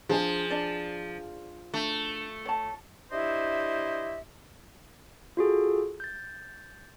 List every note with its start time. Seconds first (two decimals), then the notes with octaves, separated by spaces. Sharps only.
0.09 F3 D4 G#4 G#5
0.50 D4 D5
1.74 A3 D4
2.45 C#5 A5
3.12 D4 E4 G4 C5 D#5 E5
5.37 F4 F#4 G#4 A4
6.00 G6 A6